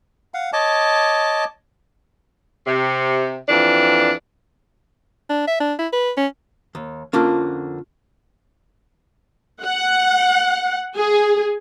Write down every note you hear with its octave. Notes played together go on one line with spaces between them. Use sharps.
F5 F#5
C#5 D#5 A5 D6
C3
F2 E3 D4
D4
E5
D4
E4
B4
C#4
D#2
F2 D3 A#3 C#4 F4
F#5
G#4